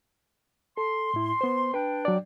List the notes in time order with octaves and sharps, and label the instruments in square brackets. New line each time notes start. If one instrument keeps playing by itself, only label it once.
[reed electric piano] A4 [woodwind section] C6
[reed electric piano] A2 E4
B3 C5
[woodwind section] D4 G5 [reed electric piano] B4
[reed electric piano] F#3 D5